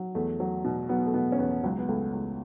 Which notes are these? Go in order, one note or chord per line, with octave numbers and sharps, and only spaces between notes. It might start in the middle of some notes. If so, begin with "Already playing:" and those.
Already playing: F#3
E2 A3
F#3
B2
F#3 B3
A3
B2 B3
C#4
E2 B3
C#2 F#3
B3
C#2 A3
C#2